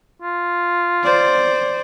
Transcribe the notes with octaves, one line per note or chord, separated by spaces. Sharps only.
F4
C5 D5